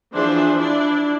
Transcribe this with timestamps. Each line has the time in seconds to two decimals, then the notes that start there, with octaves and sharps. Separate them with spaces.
0.14 E3 F3 D4 G#4 C5 E5
0.59 D4 E4 D5